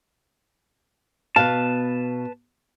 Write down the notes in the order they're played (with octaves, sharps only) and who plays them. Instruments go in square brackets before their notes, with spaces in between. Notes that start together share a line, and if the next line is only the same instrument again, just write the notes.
[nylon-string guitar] B2 F5 [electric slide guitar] B4 A5